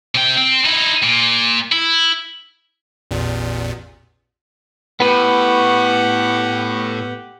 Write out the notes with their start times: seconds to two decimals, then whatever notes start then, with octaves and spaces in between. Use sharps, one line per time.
0.15 C3 G5
0.38 C4
0.65 D#4 E4
1.03 A#2
1.72 E4
3.11 A1 E2 A#2
5.00 A2 B3 G4 B4 F#5